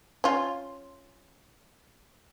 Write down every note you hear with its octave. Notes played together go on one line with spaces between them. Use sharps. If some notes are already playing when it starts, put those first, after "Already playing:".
C#4 F4